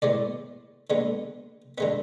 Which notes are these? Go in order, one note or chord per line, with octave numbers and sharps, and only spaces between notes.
A2 G#3 B3 D5
D3 G#3 B3
D3 G#3 B3 E5